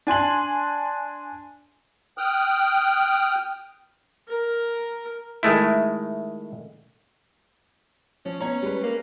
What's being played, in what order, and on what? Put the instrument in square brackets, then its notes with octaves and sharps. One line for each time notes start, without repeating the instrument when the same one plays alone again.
[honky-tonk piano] D4 G#5 C6 F#7
[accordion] G5 D#6 F6 F#6
[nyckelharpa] A#4
[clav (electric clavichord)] D#3 G#3 A3 E4
[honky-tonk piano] F3 [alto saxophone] C#4
[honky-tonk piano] B3 C#5 A#5 [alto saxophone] C#4
[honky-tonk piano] G3 G#3 B4
[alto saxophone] A#3